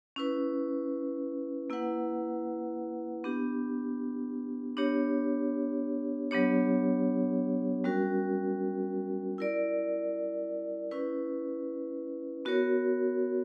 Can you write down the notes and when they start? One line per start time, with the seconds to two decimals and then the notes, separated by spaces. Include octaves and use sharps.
0.16 C#4 E4 B4
1.70 A#3 E4 B4 F#5
3.24 B3 D4 G4
4.77 B3 D4 G4 C#5
6.31 F#3 B3 D4 G4 C#5
7.84 G3 C#4 F#4 A#4
9.38 E4 A#4 D5
10.91 C#4 E4 B4
12.45 B3 F#4 A#4 C#5